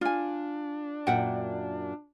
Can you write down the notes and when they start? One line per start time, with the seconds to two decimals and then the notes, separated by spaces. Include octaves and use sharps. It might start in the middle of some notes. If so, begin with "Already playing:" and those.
0.01 D4 F4 G#5
1.07 F#2 A#2 E5 F#5 G5